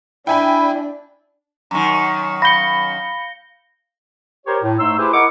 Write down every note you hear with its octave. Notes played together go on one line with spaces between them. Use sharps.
D4 E4 G5 G#5 B5
F#2 D#3 A#5 C#6
F5 B5 G6 A#6 C#7 G7
G4 A#4 C5 C#5
A2
G#2 A3 D#4 C6 E6
E4 G4 G#4 B4 C5
E4 A#4 D#5 F#5 C#6 D6